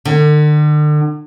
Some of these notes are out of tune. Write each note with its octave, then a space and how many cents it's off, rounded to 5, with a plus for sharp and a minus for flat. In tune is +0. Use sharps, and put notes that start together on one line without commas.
D3 +40